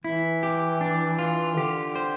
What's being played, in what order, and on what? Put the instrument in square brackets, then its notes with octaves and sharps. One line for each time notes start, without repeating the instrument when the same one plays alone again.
[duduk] E3 [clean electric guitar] E4
[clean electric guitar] G4
D4
F4
[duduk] D3 [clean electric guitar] G4
[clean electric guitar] C5